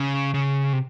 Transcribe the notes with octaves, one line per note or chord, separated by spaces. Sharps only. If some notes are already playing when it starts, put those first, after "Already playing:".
Already playing: C#3
C#3
C3